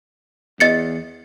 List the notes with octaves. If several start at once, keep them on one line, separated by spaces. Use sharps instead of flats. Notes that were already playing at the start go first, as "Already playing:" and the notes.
E2 D#5 A6 C#7